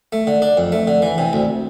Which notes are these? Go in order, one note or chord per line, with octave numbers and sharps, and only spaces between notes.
A3
D3
D4
F2
A3
D3
E3
C3
D2